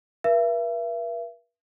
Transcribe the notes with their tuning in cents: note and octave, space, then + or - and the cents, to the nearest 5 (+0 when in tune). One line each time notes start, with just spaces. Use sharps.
B4 -45 E5 +35